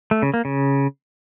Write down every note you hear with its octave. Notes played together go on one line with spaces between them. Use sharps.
A3
C#3
A#3
C#3